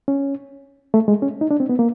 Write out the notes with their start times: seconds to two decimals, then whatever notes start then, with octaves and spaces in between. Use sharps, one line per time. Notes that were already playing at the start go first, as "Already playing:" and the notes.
0.08 C#4
0.94 A3
1.08 G#3
1.22 C#4
1.41 D#4
1.51 D4
1.60 C4
1.69 B3
1.79 A#3